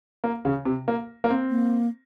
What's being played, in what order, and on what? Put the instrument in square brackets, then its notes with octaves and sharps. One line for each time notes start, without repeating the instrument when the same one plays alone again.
[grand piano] A#3
C#3
C3
A#3
A#3
C4
[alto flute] A#3